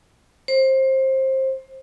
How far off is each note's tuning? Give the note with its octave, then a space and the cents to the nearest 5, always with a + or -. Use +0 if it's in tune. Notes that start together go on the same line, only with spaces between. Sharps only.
C5 +20